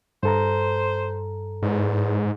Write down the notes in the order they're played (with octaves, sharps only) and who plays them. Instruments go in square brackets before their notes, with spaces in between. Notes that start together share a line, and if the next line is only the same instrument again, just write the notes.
[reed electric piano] G2 A4 A#5 [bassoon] C5
[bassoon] E2 [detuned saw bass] G#2